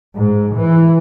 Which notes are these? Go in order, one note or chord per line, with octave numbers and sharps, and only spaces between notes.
G#2
E3